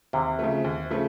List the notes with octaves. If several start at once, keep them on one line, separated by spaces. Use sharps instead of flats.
D#2 C3
C#3 F3 A3
D#2
C#3 F3 A3